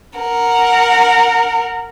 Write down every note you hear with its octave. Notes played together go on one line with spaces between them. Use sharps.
A#4 F#5